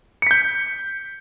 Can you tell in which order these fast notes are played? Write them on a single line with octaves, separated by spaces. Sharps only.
C#7 B6 G6